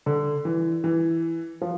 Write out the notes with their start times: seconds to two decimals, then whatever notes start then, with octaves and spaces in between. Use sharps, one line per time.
0.06 D3
0.45 E3
0.84 E3
1.62 F3